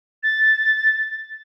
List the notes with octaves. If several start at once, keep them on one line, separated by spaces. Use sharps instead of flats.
A6